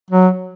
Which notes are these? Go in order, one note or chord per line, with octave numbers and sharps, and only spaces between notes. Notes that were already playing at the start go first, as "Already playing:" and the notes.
F#3